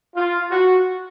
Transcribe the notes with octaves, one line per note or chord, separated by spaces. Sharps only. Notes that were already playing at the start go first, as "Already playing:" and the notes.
F4
F#4